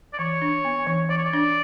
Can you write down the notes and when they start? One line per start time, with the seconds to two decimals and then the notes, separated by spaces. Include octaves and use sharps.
0.13 D5
0.19 E3 C#5
0.42 D4
0.65 B3
0.87 E3
1.09 E3 D5
1.18 C#5
1.25 D5
1.33 D4